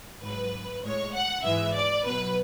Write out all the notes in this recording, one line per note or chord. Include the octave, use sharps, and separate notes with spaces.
G#2 F#3 B4
A2 G#3 C#5
F#5
G#2 E3 G#3 E5
D5
B2 F#3 B4